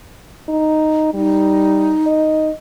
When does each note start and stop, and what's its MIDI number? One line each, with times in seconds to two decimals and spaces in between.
0.49 1.10 63
1.14 1.95 55
1.14 2.50 63
2.06 2.53 75